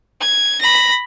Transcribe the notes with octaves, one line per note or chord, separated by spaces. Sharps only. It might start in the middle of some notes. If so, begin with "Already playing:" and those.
G#6
B5 A#6